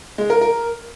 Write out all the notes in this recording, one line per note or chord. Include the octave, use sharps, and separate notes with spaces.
G#3
A#4
A#4